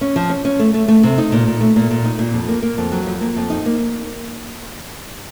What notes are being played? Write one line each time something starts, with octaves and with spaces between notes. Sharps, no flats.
C#4
F3
C#4
C#4
A3
A3
A3
C3
D#4
A#2
A#2
A3
A#2
A#2
D#4
A#2
F2
A#3
A#3
F2
F#3
F2
A#3
F2
D#4
A#3